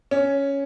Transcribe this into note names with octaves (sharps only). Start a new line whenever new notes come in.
C#4